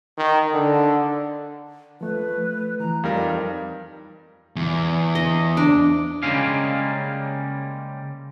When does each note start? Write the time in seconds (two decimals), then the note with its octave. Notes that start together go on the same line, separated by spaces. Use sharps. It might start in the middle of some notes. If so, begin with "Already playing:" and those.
0.18 D#3
0.54 D3
2.01 F3 A3 B4
2.80 E3 A#5
3.04 F2 G3 D#4 A#4 F5
4.56 E2
5.15 D#5
5.57 D4
6.23 C#3 G3 G#3 A#3 C#4 F5